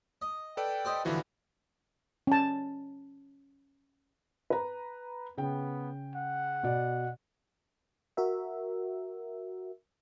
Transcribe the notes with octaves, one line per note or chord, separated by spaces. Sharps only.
D#5
A4 B4 D5 G5
G4 C5 D#5
A1 D3 E3 F3 E4 F#4
C#4 A5
B4 A#5
C#3 B3 G5
F#5
B2 D5
F#4 A#4 E5